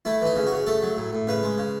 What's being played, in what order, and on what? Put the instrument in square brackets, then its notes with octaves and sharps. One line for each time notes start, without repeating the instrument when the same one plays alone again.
[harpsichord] A3 E4
E3 D#4
C#3
F#4
C#3
A3 A4
F#3
A2
A2
C#3 B4
G#3
C#3